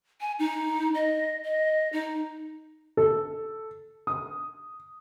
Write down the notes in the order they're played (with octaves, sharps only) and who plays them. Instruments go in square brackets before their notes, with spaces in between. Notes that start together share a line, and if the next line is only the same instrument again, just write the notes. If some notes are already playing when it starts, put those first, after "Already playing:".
[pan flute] G#5
D#4
D#5
D#5
D#4
[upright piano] A4
D#6